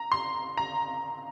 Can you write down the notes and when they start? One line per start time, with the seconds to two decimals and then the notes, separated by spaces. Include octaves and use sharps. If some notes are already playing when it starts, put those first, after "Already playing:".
Already playing: A#5
0.12 C6
0.57 A#5